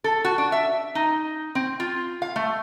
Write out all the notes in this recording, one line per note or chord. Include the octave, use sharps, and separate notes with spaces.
A4
F#4
D4
E5
D#4
C4
F4
F5
A3